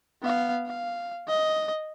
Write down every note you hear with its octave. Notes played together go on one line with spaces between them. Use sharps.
B3 F5
F5
D#5